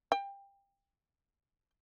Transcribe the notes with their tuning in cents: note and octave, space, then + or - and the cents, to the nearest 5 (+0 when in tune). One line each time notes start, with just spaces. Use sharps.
G5 +20